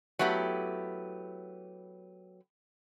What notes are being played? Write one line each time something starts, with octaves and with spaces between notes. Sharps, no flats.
F#3 A3 B3 E4 G4